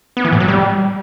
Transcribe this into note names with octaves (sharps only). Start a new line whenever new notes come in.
B3
E3
A2
F#3
G3